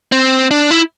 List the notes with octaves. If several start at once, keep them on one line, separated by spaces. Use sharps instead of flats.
C4
D4
E4